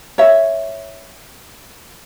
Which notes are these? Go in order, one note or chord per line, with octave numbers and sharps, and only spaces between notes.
C#5 E5